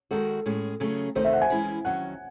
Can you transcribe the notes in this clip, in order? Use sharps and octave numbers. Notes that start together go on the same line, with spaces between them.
D#3 G#3 D#4 F#4 A4
A2 G#3 C#4 G#4
C#3 F#3 A3 C#4 G#4
C3 D#3 A3 C5
E5
F#5
G#5
E3 G#3 C#4 E4
D#3 F#3 C#4 F#5